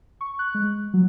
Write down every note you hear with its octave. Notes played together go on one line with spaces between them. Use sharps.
C#6
F#6
G#3
F#3